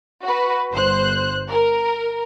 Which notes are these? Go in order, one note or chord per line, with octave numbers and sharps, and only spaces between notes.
F#4 B4
G1 C5 F#6
A#4